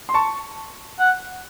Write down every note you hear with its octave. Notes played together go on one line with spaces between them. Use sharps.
C6
A5 C#6
F#5